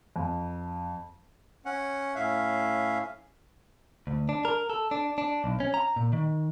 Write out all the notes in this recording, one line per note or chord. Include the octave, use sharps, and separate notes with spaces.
F2
C#4 F#5
A2 C#4 E5 F5
D2
D4
A#4
A4
D4
D4
B1
C#4
A#5
A#2
D#3